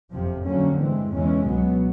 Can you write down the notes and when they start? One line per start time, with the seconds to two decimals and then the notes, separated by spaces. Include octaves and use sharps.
0.11 F#1 F2 C3 F3
0.45 F2 D3 F#3 A#3 C#4
0.79 G2 E3 G#3 C4
1.13 E2 C#3 E3 G#3 C#4
1.46 C#2 B2 F#3 B3